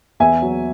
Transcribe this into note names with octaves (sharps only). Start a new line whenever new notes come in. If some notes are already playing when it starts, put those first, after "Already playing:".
E2 E5 G#5
F#3